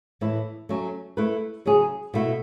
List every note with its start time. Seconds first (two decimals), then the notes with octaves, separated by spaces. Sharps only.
0.21 A2 E3 A3 E4
0.69 F#3 A3 C#4
1.17 A3 E4 B4
1.66 C#3 F#3 C#4 G#4
2.14 B2 A3 E4